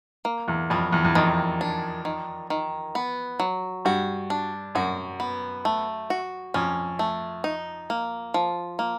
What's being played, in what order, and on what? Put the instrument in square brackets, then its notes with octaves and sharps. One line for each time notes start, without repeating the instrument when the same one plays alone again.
[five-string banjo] A#3
[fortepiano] E2
[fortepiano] F2 [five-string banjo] G3
[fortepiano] E2
E2
[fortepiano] F2 [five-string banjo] D#3
[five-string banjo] D4
D#3
D#3
B3
F#3
[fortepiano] G2 [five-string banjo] F#4
[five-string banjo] D4
[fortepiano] F#2 [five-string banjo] F#4
[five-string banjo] B3
A3
F#4
[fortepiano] F2 [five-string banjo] C#4
[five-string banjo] A3
D#4
A#3
F3
A#3